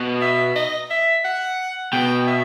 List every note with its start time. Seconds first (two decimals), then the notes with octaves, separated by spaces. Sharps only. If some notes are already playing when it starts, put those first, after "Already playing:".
Already playing: B2
0.22 E5
0.56 D#5
0.91 E5
1.25 F#5
1.92 B2 G5
2.27 E5